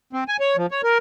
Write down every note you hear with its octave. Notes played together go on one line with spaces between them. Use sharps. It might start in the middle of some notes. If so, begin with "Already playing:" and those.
C4
G#5
C#5
F3
C#5
A#4